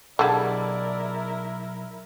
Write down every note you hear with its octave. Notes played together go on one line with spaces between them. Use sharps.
B1 D3 G3 E4 G#4 A#4 D5 A5